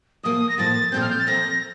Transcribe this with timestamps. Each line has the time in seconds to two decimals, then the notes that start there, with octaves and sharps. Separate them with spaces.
0.23 A2 F3 A#3 D#6
0.49 A#6
0.58 A2 F3 A#3 A6
0.92 A#2 F3 A3 C4 G6
1.01 F6
1.10 G6
1.19 A6
1.27 A#2 F3 A3 C4 A#6